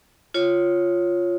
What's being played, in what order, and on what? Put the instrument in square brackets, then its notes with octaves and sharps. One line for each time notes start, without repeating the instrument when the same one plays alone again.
[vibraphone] F4 C#5